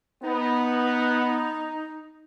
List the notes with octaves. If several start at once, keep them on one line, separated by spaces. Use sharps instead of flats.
B3 D#4